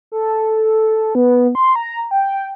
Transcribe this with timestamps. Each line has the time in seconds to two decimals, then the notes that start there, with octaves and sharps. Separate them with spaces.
0.12 A4
1.15 B3
1.55 C6
1.76 A#5
2.11 G5